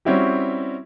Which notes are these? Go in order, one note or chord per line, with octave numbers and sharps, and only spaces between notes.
G3 C4 C#4 E4 F#4 G4